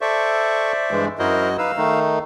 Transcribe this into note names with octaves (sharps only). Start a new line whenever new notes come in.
A4 C5 D5 E5 C#6
G2 E3 G#3
F#2 E4 F#4 A#4 C5 D#5
D#4 B4 F5 E6
D#3 A3 D#4